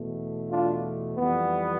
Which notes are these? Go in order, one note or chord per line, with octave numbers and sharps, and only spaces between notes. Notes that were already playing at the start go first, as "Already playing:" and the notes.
Already playing: E2 B2 A3
D4 F4
F2 E3 G3 B3